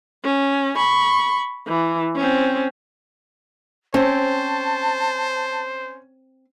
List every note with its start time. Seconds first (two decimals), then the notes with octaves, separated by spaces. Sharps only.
0.24 C#4
0.76 B5 C#6
1.67 E3
2.16 C4 C#4
3.94 C4 C#4 C5 A5